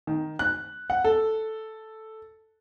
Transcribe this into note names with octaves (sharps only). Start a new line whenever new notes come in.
D#3
F#6
F#5
A4